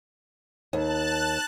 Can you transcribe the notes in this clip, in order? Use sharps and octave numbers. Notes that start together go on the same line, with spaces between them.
D#2 A5 F#6